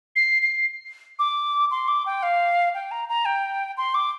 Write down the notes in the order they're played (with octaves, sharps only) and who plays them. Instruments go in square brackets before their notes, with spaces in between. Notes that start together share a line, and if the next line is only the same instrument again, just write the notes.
[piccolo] C7
C7
D6
C6
D6
G5
F5
G5
A#5
A#5
G5
C6
D6